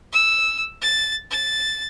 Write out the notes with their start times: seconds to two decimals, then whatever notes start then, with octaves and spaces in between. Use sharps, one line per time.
0.12 E6
0.82 A6
1.31 A6